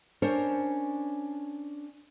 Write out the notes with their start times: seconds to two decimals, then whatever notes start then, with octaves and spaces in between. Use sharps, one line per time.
0.22 C#4 D4 A#4 C5 C#5